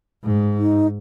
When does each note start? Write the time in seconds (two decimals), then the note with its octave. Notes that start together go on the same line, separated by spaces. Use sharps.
0.24 G#2
0.58 D#4